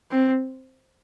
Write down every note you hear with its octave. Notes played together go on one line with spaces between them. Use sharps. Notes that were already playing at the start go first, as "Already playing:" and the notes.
C4